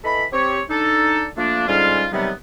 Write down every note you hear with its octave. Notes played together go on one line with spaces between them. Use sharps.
E3 A4 D#5 B5
C4 G4 C#5
D4 D#4 A4
F3 A3 A#3 D4
G#2 D3 G3 C#4 F4
C3 D#3 F#3 G3 B3